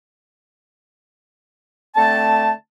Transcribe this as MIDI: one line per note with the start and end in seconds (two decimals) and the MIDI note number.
1.96 2.50 50
1.96 2.50 57
1.96 2.50 60
1.96 2.50 81